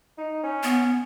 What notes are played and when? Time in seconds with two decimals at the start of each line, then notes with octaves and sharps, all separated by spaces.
0.18 D#4
0.44 C#4
0.63 B3